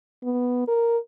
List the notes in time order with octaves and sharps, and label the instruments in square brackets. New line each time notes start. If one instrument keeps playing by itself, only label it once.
[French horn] B3
A#4